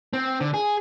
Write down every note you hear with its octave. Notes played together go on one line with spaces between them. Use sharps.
C4
D3
G#4